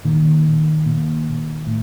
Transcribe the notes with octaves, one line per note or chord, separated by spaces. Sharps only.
A#2 D#3
A#2
A2